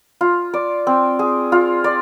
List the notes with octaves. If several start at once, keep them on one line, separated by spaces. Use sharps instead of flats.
F4
D5
C4
G#4
F4
D5